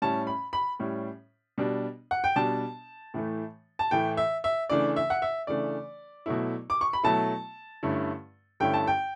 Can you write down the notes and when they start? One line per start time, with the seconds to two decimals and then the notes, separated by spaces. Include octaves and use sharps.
0.02 A2 G3 C#4 A5
0.27 B5
0.53 B5
0.80 A2 G3 C#4
1.58 B2 G3 D4
2.11 F#5
2.24 G5
2.36 B2 G3 D4 A5
3.14 A2 E3 A3
3.79 A5
3.91 A2 E3 A3 G5
4.17 E5
4.44 E5
4.70 C#3 E3 A3 D4 D5
4.96 E5
5.10 F#5
5.22 E5
5.47 C#3 E3 A3 D4 D5
6.26 B2 F#3 A3 E4
6.70 D6
6.81 C#6
6.93 B5
7.03 B2 F#3 A3 E4 A5
7.83 G2 D3 A3 C#4 E4
8.60 G2 D3 A3 C#4 E4 G5
8.73 A5
8.87 G5